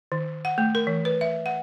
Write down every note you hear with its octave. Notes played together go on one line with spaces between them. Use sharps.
D#3
F#5
A3
A#4
E3
B4
E5
F#5